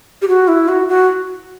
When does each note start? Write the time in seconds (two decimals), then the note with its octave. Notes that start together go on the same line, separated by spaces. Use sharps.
0.22 G4
0.28 F#4
0.48 E4
0.68 F#4
0.88 F#4